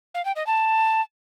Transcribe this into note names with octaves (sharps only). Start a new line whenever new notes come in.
F5
G5
D#5
A5